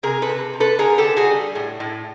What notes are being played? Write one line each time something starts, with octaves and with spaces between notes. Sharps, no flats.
C3 G#4 A#4
A4 B4
C3
C3
A4 B4
D3 G#4 A#4
G4 A4
D3
F#4 G#4
G3
A2
A2